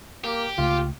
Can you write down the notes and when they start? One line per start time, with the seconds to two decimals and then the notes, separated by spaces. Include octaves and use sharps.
0.24 A#3 G4
0.58 C#2 C#3 A3 F4